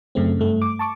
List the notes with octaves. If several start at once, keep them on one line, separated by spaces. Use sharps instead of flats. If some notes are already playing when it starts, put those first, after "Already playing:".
F#2 C#3 A3 C4
G2 A3
D6
A5 C#6 D6